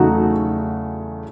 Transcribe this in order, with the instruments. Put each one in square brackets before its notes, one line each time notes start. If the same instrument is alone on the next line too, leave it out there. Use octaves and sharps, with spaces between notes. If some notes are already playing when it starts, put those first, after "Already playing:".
Already playing: [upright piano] E2 C#3 F#3 A3 D#4 F#4